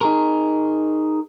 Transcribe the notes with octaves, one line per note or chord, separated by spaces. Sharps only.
D#4 G#4 A#4